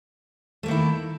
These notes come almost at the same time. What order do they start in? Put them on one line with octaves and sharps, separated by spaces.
A3 A#3 D#3 E4